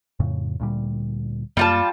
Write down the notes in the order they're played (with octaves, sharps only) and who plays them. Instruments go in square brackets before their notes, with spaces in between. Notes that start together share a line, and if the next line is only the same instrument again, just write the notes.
[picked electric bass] F2 A2 C#3
D2 A#2 G3
[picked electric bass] F#2 A#3 [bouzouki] G3 F4 A5